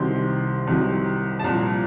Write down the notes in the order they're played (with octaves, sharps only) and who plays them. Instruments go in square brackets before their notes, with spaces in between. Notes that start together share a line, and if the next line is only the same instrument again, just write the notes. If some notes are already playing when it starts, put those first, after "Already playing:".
Already playing: [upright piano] C2 C3 D#3 F#3 C6
C2 C3 D#3 F#3
A5
C2 A#2 F3 A#5